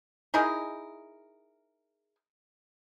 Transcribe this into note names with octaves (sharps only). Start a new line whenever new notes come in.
D#4 E4 G#4 A#4